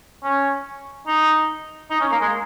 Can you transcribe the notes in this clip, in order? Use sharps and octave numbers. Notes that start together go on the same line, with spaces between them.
C#4
D#4
D#4
C#4
A#3
G#3